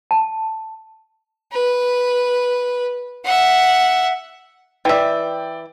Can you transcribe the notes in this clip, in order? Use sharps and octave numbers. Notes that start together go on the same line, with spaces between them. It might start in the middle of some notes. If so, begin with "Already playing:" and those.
A5
B4
E5 F#5
E3 D5 E5 G5